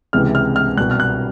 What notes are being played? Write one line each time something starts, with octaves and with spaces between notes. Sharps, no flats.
C#2 C3 E3 G#3 F6
F6
F6
C2 B2 G3 F#6
F6
F#6